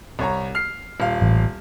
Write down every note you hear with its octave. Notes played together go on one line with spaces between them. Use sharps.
C2 C#5 A#5
F6 C7
D#1 F5
A1